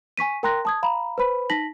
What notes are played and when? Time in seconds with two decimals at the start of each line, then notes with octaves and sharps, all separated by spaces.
0.17 G#5 C#6 B6 D#7
0.43 A#4 G5 A#5 C6 F#6 A#6
0.65 A5 D#6 G#6
0.83 F5 A#5 B5
1.18 B4 C5 B5
1.50 D#4 A5 A#6 B6 F#7